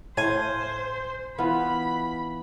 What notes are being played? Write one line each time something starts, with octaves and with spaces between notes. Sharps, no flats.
A2 C5 F5 G#5
E3 B3 F4 B5